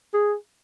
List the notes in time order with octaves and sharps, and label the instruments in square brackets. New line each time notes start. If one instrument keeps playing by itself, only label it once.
[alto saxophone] G#4